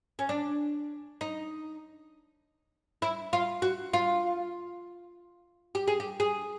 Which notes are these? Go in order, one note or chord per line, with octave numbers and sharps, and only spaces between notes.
C#4
D4
D#4
E4
F4
F#4
F4
G4
G#4
G4
G#4